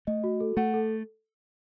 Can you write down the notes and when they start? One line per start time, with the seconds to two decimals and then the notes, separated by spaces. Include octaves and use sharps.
0.07 A3 D#5
0.24 F#4
0.40 A4
0.57 A3 F#5
0.74 A4